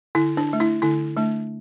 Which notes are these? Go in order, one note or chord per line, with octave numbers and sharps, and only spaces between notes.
D3 E4
D4
A3 D4
E4
D3 E4
A3 D4